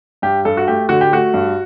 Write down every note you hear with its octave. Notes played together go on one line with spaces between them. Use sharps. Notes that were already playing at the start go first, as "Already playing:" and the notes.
G2 G4
G2 A4
F#4
A3 G4
D3 F#4
G4
A3 F#4
G2